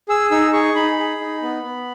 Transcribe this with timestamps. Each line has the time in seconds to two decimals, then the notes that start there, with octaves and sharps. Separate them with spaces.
0.09 G#4 E6
0.31 D#4 E6
0.53 G#4 C#6
0.75 D#4 B5
0.98 G#4
1.21 D#4
1.42 B3
1.64 B3